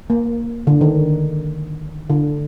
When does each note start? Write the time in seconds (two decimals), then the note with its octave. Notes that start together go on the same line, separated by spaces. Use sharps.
0.10 A#3
0.67 D3
0.81 D#3
2.10 D3